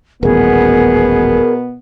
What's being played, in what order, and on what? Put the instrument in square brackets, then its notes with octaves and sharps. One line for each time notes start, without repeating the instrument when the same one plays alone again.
[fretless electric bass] D#1 A1 [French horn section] B2 B3 [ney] G#4 [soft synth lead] A#4